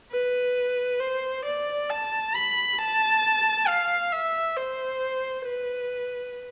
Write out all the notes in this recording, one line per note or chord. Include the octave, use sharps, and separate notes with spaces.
B4
C5
D5
A5
B5
A5
F5
E5
C5
B4